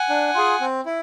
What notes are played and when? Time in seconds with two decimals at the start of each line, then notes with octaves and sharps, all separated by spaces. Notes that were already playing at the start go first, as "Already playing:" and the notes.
Already playing: F#5 G#5
0.09 D4
0.35 F4 G#4
0.60 C4
0.86 E4